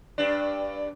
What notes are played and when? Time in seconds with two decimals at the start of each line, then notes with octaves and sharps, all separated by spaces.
0.18 G2 D4